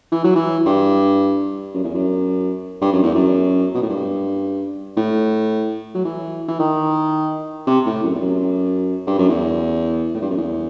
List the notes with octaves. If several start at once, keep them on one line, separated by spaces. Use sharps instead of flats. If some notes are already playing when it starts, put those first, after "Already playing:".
E3
F#3
E3
G2
F#2
E2
F#2
G2
F#2
E2
F#2
B2
A2
G2
A2
F#3
E3
E3
D#3
C3
A2
F#2
E2
F#2
G2
F#2
E2
A2
G2
F#2
E2